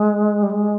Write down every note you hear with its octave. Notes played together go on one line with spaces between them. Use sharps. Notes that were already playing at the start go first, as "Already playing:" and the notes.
Already playing: G#3
G3
G#3